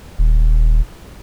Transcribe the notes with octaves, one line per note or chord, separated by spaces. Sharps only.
D#1